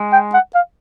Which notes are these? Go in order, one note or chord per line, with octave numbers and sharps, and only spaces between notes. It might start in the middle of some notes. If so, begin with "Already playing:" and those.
Already playing: G#3
G5
F#5
F5